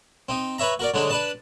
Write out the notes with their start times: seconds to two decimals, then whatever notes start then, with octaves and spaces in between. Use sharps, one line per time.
0.29 C4 D#4
0.58 B4 C#5 E5 A#5
0.79 F#4 A#4 D5
0.94 D3 F#3 G#3 D4 D#4
1.10 D4 B4 A5